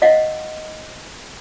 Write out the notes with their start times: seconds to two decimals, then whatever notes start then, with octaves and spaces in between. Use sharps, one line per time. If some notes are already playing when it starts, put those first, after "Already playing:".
0.02 D#5 F5 F#5